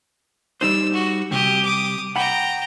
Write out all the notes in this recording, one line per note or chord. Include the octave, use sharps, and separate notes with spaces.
G3 D#4 C5 E6
F#4
C3 G3 G4 D#6
D6 D#6
F#5 G5 A#5 B5